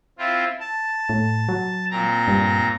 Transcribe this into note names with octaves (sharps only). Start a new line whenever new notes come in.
C4 E4 F4
A5
A2
F#3
A#2 C4 A#5
G2